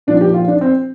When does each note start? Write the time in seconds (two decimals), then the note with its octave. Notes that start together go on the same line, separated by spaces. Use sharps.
0.07 A#2 F3 D4
0.21 G4
0.34 F4
0.48 D4
0.61 C4